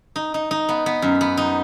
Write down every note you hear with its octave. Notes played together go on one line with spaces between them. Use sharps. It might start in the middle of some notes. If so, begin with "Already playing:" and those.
D#4
D#4
D#4
B3
B3
F#2
B3
D#4